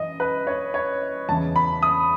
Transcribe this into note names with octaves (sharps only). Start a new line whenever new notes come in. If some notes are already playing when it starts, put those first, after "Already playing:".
Already playing: F#2 E3 D#5
B4
C#5
C#5
E2 C#3 E3 A5
B5
D#6